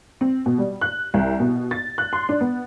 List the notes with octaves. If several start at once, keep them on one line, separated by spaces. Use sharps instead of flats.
C4
B2
G3
F#6
C2
B2
A6
F#6
C6
D4
B3